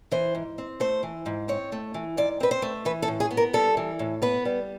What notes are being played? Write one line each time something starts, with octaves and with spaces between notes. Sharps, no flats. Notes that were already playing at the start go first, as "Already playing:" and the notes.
E3 C5
G#2
C4
A3 C5
E3
G#2
C4 C#5
A3
E3
G#2 D5
C4 B4
C5
A3
E3 B4
A4
A2
G#4
B3
A#4
G3 A4
E3
A2
B3 B4
G3